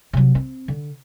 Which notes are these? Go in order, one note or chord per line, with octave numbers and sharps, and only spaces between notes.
C3 F#3
C4
D3